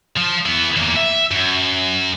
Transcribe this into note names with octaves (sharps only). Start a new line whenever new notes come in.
F3
E3 B3
E2 A#3
E5
F#2